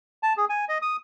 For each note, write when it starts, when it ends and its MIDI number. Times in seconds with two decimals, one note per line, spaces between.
0.23 0.33 81
0.37 0.45 68
0.49 0.65 80
0.69 0.78 75
0.82 0.96 87